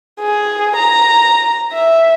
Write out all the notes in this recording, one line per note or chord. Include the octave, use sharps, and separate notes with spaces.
G#4
A#5
E5